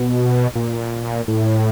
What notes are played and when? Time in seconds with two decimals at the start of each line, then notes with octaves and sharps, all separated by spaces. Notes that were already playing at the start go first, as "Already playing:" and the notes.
Already playing: B2
0.55 A#2
1.28 A2